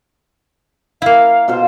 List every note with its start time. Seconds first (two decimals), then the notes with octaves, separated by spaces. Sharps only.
1.02 A#3 E4 F5
1.48 B2 F4 C5